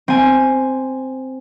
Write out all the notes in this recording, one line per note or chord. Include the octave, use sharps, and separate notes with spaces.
C4 G#5